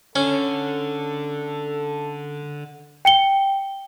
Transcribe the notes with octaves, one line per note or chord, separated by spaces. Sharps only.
D3 C#4 A4
G5 C#7 G7